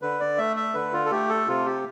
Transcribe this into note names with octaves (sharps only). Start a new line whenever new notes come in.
D3 B4
D5
A3 E5
E5
D3 B4
F4
A4
A3 G4
A4
C3 F4
G4